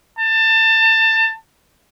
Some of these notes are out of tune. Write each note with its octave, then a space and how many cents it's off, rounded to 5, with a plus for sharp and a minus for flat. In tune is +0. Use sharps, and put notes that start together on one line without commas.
A5 +25